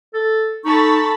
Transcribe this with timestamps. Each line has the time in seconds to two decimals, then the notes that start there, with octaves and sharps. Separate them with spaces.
0.14 A4
0.65 D#4 A4 A5 B5 C#6